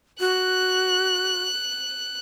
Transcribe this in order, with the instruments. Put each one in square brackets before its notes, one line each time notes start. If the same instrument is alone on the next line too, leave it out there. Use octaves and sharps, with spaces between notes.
[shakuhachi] F#4 [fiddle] F#6